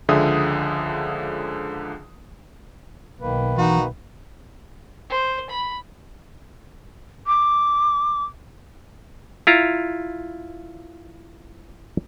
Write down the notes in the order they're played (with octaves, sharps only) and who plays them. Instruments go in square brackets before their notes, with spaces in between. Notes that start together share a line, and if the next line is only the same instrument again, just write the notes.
[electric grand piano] C#2 D3 F3 G#4 E5 D#6
[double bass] B1 [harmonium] D#3 A#3 B4
[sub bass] E3 [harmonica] D#4 F#4
[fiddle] C5
B5
[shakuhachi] D6
[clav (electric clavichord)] E4 F4 A#5